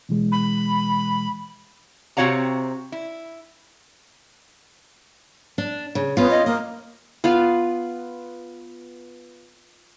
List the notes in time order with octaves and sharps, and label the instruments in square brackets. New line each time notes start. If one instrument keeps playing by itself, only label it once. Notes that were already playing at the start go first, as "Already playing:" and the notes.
[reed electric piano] B2 E3 G#3
[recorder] B5
[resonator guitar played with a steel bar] C3 C4 F#4 C#5 F5 A#5
E4
[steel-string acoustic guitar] D4
C#3
[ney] B3 [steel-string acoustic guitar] C#4 F4
[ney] D#5
[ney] A#3 [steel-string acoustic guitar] D#5
[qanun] B3 F4 F5